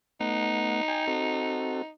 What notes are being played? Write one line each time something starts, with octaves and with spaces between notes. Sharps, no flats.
A3 B3 D#4 F#5
G5 G#5
C4 F#4 A4